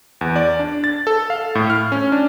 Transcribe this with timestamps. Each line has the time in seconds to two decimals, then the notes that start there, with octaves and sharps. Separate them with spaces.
0.21 E2
0.36 D5
0.59 D4
0.84 A6
1.07 A4
1.30 F5
1.55 A2
1.70 F6
1.92 C#4
2.12 D4